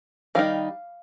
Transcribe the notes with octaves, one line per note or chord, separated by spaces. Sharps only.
D#3 G3 D#4 F5